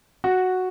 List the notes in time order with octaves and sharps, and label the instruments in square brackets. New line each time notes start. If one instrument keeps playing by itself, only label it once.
[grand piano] F#4